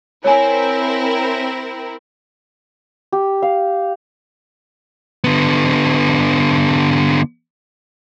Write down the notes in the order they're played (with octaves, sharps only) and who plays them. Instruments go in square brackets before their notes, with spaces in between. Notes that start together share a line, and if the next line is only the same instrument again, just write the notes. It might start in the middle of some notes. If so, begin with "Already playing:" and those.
[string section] C4 E4 A#4 [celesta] C#5 G#5
[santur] G4
F5
[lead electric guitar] D3 B3